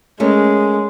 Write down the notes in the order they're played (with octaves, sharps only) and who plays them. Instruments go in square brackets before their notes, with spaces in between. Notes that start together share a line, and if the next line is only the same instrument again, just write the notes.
[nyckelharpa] G#3 [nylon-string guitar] A3 C#4 A#4